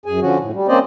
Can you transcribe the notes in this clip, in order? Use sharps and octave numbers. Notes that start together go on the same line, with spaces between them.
F#2 G#4 G#5
D3 F3 C#4 F#4
A2
G3
A#3 C4 C#4 C5 D5 D#5